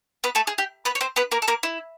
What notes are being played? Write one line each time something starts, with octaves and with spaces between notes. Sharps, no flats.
B3 B4
A3 A4
G#4
G4
B3 B4
C#5
C4 C5
B3 B4
A#3 A#4
A4
A#3 A#4
E4